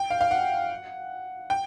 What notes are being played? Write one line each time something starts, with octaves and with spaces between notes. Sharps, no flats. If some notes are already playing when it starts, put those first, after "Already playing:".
Already playing: G5
F5
F5
F#5
G5